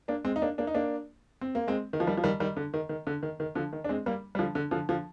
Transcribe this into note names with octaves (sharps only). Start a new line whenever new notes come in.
A#3 D4
G#3 C4
D#4
A#3 D4
A#3 D4
D#4
A#3 D4
C4
A#3
G#3 C4
D#3
F3
D#3 G3
F3
D#3 G3
D#3 G3
D3
D#3
D#3
D3
D#3
D#3
D3 F3
D#3
D4
G#3 C4
G3 A#3
G3
D3 F3
D3
D3 F3
D3 F3